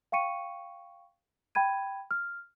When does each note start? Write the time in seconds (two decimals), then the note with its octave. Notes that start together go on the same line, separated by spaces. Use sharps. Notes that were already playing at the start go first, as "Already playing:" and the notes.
0.12 F5 G5 C#6 C#7 D#7
1.55 G5 B5 G#6 D#7
2.11 F6